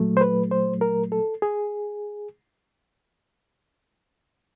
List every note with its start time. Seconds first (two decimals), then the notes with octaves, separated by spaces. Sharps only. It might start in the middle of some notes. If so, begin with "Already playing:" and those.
Already playing: A#2 F#3 A3
0.17 C5
0.21 B4
0.51 C5
0.81 A#4
1.12 A4
1.42 G#4